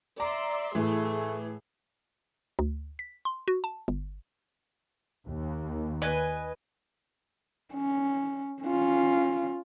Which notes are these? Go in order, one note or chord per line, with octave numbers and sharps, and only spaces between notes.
D5 E5 A#5 C6 D6
A2 E3 A3 E4 G#4
D2
B6
C6
F#4
A5
G1
D#2
B4 D#5 G#5
C#4
C#4 F4